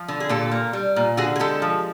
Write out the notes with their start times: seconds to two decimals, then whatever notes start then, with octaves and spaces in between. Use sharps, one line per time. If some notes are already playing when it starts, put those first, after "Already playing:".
Already playing: F3
0.08 D3
0.20 G#4
0.29 A#2 G4 A4
0.51 A#3
0.73 G3
0.96 A#2
1.17 D3 F#4 G#4
1.36 G#4
1.40 G#3 G4 A4
1.62 F3